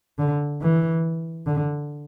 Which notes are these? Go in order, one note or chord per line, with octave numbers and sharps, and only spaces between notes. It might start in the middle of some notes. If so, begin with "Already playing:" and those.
D3
E3
D3